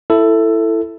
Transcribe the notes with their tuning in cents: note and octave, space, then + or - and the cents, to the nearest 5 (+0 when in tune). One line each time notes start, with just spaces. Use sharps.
E4 +10 A4 +10